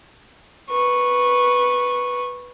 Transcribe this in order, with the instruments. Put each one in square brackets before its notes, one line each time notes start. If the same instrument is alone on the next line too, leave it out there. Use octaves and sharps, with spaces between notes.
[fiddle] B4 C#6